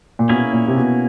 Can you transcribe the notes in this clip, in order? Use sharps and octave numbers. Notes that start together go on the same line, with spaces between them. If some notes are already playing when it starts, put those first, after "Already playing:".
A#2
B2 A#3 C#4 E4 G#4
A#2
C3
B2